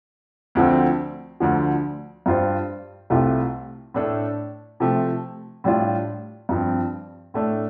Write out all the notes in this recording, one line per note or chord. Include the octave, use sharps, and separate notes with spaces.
D2 D3 F3 A3 C4
D2 D3 F3
G2 G3 F4 C5
C2 C3 A3 F4
A2 A3 D4 A4
C3 F3 A3
A2 G3 D4 F4
G2 F3 C4
A2 A3 D4